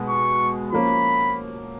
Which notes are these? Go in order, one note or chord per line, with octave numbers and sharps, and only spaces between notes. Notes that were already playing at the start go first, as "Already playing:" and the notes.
Already playing: B2 G#3 B3
C#6
F3 A#3 C#4 B5